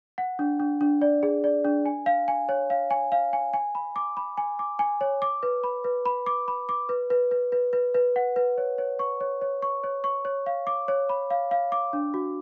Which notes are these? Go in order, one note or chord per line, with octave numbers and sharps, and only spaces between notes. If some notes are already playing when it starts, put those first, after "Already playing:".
F#5
D4
D4
D4
D5
G#4
D5
D4
G#5
F5
G#5
C#5
F5
G#5
F5
G#5
G#5
B5
D6
B5
G#5
D6
G#5
C#5
D6
B4
B5
B4
B5
D6
B5
D6
B4
B4
B4
B4
B4
B4
F#5
B4
C#5
C#5
C#6
C#5
C#5
C#6
C#5
C#6
C#5
F5
D6
C#5
B5
F5
F5
D6
D4
F#4